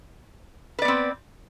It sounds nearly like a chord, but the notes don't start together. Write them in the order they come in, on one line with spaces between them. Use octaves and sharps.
B4 D5 B3 C4